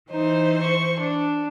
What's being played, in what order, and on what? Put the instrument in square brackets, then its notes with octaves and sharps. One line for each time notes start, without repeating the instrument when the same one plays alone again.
[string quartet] E3 C5 [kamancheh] D#4
[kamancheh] C#6
D4